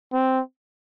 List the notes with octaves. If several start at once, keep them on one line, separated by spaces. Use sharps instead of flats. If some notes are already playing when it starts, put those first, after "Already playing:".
C4